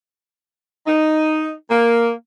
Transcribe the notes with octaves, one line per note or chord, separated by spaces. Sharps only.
D#4
A#3